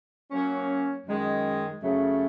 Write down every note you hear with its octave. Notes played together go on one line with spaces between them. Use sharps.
F#3 A#3 C#4
F#2 D#3 G#3
F#2 C#3 F#3 A3